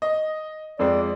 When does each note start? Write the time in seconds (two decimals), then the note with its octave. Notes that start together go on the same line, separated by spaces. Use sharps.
0.02 D#5
0.79 F2 G#3 C4 D5